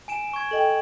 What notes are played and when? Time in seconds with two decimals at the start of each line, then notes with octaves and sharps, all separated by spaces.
0.08 G#5 D7 E7
0.33 C#6 G#6
0.51 A4 D#5 G5 F#7